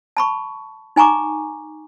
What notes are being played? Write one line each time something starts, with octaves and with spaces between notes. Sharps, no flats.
A5 B5 C#6
D#4 G#5 A#5 C#6 D6